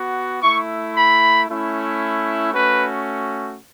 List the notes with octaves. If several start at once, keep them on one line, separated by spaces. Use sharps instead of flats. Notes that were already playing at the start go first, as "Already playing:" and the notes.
Already playing: B3 F#4
A3 E4 C#6
B5
A3 C#4 E4
A3 C#4 F#4 B4